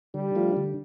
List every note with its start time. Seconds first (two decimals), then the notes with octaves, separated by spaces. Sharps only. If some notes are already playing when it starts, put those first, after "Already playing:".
0.14 D3 G3
0.35 F3 A3 D4 F4
0.57 D3